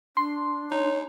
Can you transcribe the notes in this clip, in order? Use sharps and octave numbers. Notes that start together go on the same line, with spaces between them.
D4 C6
D#4 C#5